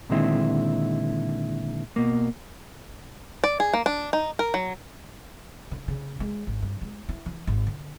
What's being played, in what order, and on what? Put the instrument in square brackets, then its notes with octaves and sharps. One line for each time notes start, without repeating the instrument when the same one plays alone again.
[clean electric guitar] A#2 D3 D#3 G#3 C4 E4
B2 A#3
[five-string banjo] D5
G#4
A#3
D4
D#4
A#4
F#3
[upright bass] D3
C#3
G#3
G#1
G2
G#3
E4
E3
G#1
D3